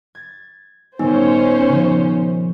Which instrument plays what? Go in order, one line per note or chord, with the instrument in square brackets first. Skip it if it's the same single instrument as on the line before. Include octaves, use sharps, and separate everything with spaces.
[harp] G#6 A6
[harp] A#2 D#3 G3 [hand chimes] B3 D#4 G#5 [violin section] C#4 C5
[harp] C#3 F3